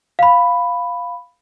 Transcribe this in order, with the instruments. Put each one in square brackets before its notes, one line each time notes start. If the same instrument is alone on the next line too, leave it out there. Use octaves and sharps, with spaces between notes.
[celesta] F5 B5